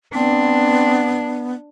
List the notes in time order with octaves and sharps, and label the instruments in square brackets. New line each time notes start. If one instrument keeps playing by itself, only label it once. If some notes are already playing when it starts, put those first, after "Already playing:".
[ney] B3 [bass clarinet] C4 [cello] D4